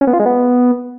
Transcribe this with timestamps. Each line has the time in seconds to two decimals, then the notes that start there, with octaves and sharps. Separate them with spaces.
0.01 C#4
0.07 B3
0.13 F4
0.20 G#3
0.26 B3